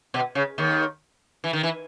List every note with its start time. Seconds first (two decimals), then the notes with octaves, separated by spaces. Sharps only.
0.14 B2
0.35 C#3
0.58 D#2 D#3
1.44 E3
1.53 D#3
1.63 E3